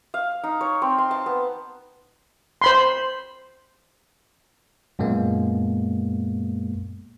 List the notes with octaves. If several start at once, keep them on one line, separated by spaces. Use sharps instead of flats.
F5
D#4
C#5
C4
C6
A5
B3
C5 B5 C6
F#2 A#2 G#3 A#3 B3